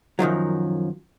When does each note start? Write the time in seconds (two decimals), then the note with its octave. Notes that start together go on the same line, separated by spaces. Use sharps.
0.19 F#2 D#3 F3 F#3